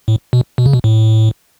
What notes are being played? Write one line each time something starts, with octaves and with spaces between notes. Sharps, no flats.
A2
B2
B2
C#3
B2
A2